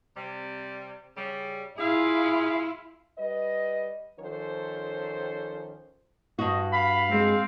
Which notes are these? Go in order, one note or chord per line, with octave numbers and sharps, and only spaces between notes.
C3 G3
C#3 G3
E4 F4 G#4 F5
G3 B4 D#5
D#3 F3 C#4 A4 C5
G2 F#4 D#5
F5 B5
G#3 C4